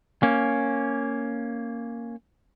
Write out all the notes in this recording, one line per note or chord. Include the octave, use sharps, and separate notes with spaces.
A#3 C#4